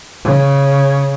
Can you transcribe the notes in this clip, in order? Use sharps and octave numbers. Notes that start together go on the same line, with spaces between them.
C#3